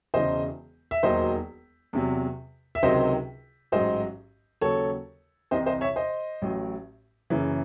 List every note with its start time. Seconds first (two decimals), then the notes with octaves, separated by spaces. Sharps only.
0.14 E1 E2 C#3 E3 C5 D#5
0.91 E5
1.03 E1 D#2 D#3 F#3 C5 D#5
1.93 E2 C3 F#3
2.75 E5
2.83 C#2 C3 D#3 F#3 C5 D#5
3.72 A1 G#2 F#3 C5 D#5
4.61 D#2 C#3 F#3 A4 C#5
5.51 C2 C3 E3 C5 D#5
5.66 C5 D#5
5.81 C#5 E5
5.96 C5 D#5
6.42 A1 A2 F#3
7.30 F#1 F#2 C#3 E3